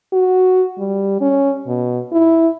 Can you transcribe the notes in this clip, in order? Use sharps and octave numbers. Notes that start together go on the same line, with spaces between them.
F#4
G3
C#4
B2
E4